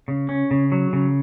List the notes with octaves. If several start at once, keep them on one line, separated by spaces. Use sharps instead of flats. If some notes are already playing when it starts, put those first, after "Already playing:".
C#3
C#4
C#3
F#3
C#3